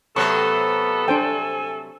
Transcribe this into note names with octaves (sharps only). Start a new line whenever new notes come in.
C3 F#3 A3 B3 A4 C#6
D4 C5 G5 G#5